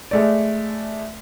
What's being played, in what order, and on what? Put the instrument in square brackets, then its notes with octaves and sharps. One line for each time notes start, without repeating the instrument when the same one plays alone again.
[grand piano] G#3 A3 D5